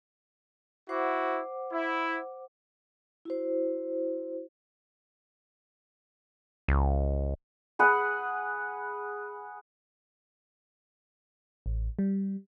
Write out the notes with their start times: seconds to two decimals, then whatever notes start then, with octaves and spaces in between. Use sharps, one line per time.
0.89 E4 F#4 C5 F#5 D6
1.73 E4
3.25 E4 F#4 C5
6.68 C#2
7.79 G#4 B4 F#5
11.66 A1
11.99 G3